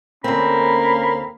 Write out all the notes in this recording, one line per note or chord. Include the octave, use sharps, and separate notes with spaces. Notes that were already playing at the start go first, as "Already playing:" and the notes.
D2 A#3 C4 C#4 B5